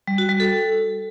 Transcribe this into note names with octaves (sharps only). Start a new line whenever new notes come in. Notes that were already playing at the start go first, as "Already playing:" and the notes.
G3
F#4
G3
A4